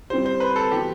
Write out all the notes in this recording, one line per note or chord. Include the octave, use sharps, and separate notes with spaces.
G3 C4 E4 G4 C5
C5
B4
A4
E3 B3 F#4 G4